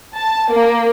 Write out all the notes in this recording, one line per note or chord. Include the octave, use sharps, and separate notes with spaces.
A5
A#3